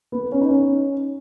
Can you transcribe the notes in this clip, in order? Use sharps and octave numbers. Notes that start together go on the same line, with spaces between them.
B3
C#4
D#4
C#4